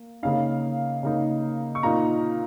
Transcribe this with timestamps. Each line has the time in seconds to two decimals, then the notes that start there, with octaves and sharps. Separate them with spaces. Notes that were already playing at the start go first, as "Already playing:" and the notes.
Already playing: A#3
0.23 C#3 A#3 D#4 F5
1.03 C#3 A#3 D#4
1.75 C#6
1.83 A#2 A#3 D#4 A#5